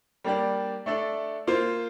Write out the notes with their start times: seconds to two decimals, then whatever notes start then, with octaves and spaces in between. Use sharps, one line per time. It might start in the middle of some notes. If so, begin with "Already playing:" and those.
0.24 G3 A#3 D4 G4 D5
0.86 A3 D4 A4 D5
1.47 A#3 F4 C5